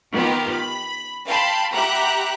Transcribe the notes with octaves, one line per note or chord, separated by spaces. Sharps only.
D#3 B3 F4 G4 A#4
B5
F5 G5 A5 B5 C6
G4 E5 F#5 A#5 B5 F#6